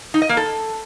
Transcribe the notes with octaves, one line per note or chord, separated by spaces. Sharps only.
D#4
D#5
A#3
A4